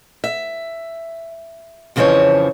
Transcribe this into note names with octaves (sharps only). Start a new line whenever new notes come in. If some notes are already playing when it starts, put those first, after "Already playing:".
E5
F2 C#3 E3 F3 C5 C#5